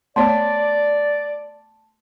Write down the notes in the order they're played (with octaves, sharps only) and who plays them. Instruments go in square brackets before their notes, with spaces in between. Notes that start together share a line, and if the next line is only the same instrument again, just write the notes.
[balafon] A3 B3 C#5 [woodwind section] D5 [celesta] A5 C6